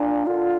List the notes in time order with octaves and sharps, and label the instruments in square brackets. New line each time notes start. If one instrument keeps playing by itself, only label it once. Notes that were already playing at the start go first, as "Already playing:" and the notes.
Already playing: [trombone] A#2 [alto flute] D4
[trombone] D3 [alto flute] F4